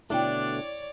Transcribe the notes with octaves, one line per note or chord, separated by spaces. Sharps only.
B2 D3 A3 D4 E4 C#5 D5 G5